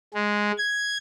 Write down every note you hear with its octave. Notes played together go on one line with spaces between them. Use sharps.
G#3
G#6